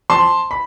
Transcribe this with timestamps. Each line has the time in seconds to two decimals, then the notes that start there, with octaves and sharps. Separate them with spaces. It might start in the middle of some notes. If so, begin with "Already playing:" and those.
0.10 F2 A5 C6
0.51 B5